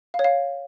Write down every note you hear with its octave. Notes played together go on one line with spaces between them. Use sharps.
F5
C#5
F5